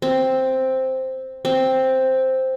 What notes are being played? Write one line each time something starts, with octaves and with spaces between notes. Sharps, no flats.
C4
C4